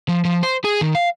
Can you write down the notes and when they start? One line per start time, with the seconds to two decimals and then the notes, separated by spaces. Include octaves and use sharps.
0.09 F3
0.25 F3
0.43 C5
0.65 G#4
0.81 D#3
0.95 F5